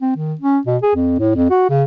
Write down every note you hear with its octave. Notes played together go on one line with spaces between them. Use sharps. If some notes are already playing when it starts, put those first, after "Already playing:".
C4
D#3
C#4
B2
G#4
F2
A2
F2
F#4
C#3